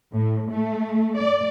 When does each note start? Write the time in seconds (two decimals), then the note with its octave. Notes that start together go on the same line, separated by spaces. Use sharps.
0.14 A2
0.51 A3
1.19 D5